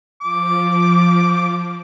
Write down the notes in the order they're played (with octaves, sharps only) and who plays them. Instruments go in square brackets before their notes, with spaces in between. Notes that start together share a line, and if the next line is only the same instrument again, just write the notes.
[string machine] F3 [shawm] D6